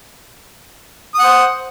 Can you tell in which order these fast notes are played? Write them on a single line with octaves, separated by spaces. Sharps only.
D#6 F#5 C5